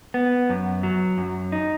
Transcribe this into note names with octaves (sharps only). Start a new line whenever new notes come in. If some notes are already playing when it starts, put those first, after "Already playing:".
B3
F#2
F#3
F#2
D#4